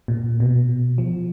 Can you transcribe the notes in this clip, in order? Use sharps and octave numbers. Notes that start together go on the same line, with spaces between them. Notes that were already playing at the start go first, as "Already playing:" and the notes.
A#2
B2
F3